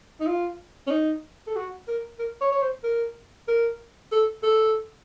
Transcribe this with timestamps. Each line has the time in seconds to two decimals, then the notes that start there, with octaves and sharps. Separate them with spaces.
0.20 D#4
0.27 F4
0.87 C#4
0.91 D#4
1.47 A4
1.56 F#4
1.88 A#4
2.19 A#4
2.41 C#5
2.52 C#5
2.62 C5
2.84 A#4
3.48 A#4
4.12 A4
4.43 A4